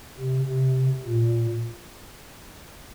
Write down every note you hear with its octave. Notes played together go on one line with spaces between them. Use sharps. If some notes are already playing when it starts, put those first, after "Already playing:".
C3
C3
A#2